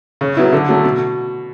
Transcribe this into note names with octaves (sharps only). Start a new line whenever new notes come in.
C#3
F#3 B3 E4
D3
F#3 A3
B2